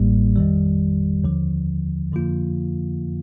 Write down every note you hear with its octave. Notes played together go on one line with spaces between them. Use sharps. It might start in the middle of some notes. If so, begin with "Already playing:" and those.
Already playing: A1 A2 G3 A#3
F2 D#3 G3
D#2 D3 F3
F2 D3 F3 A#3 F4